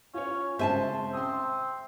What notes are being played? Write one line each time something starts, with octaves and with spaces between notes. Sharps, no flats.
C#4 F4 C#5
C#3 G#3 C4 C5 E5 G#5 A5
C4 C6 D#6